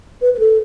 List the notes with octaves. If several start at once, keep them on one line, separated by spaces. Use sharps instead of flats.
B4
B4
A4